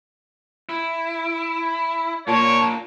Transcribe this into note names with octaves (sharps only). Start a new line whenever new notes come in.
E4
A#2 A#3 D4 C#5 A5